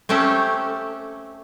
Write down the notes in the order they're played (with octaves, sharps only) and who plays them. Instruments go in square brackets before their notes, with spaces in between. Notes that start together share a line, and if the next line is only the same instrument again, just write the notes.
[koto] A3 C4 C#4 G4 A4